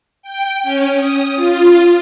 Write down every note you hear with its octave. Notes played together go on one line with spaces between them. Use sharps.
G5
C#4
D#6
F4